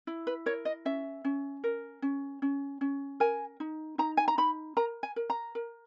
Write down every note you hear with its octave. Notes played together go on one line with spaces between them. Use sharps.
E4
B4
A#4 C#5
D#5
C#4 E5
C#4
A#4
C#4
C#4
C#4
A#4 G#5
D#4
D#4 A#5
G#5
A#5
D#4 B5
A#4 A#5
G#5
A#4
A#5
A#4